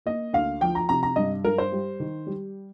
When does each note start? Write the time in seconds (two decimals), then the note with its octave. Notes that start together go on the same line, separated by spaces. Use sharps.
0.06 A#3 D#5
0.33 D2 F5
0.61 F3 G5
0.75 A#5
0.89 C3 A#5
1.03 A#5
1.16 G2 D#5
1.45 G2 A#4
1.58 C5
1.72 G3
2.00 D#3
2.27 G3